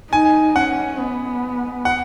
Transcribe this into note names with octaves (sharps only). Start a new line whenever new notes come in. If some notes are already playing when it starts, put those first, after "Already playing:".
D#4 G#5
C#4 F#5
B3
F#5